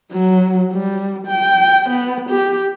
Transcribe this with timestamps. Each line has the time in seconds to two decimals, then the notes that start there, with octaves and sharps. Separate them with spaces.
0.12 F#3
0.71 G3
1.27 G5
1.90 B3
2.30 G4